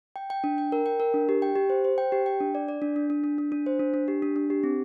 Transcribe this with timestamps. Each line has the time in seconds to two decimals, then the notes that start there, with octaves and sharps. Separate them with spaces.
0.16 G5
0.30 G5
0.44 D4
0.58 G5
0.72 A#4
0.86 G5
1.00 A#4
1.14 D4
1.29 G4
1.42 G5
1.56 G4
1.70 C5
1.84 C5
1.98 G5
2.12 G4
2.26 G5
2.40 D4
2.55 D5
2.68 D5
2.82 D4
2.96 D4
3.10 D4
3.24 D4
3.38 D4
3.52 D4
3.66 C5
3.79 D4
3.94 D4
4.08 G4
4.22 D4
4.36 D4
4.50 G4
4.63 C4